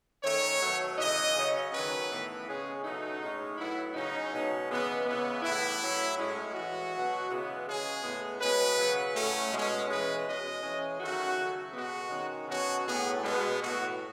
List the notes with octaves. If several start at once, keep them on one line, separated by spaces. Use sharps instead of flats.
D#3 A3 C#4 C#5
B2 F#3 A3
C#3 E3 A3 D#5
C#3 F#3 C#4
D#3 F#3 C#4 B4
A2 E3 B3
C#3 G#3 C#4 G#4
B2 F#3 A3 D#4
A2 G#3 C#4
A2 F#3 B3 E4
C#3 F#3 C#4 D#4
B2 G#3 C#4
C#3 E3 G#3 B3
C#3 E3 G#3 B3
A2 E3 B3 E4
A2 F#3 C#4
A2 G#3 C#4
E3 G#3 C#4 F#4
B2 F#3 B3
C#3 E3 G#3 B3
C#3 G#3 C#4 G#4
A2 G#3 B3
B2 G#3 C#4 B4
C#3 F#3 B3
A2 F#3 A3 C#4
B2 G#3 C#4
E3 G#3 C#4 B4
B2 G#3 C#4 D#5
E3 G#3 C#4
D#3 F#3 A3 C#4 F#4
C#3 F#3 A3
B2 G#3 B3 F#4
D#3 G#3 C#4
B2 F#3 C#4 F#4
A2 F#3 B3 G#4
B2 G#3 B3
A2 E3 B3 F#4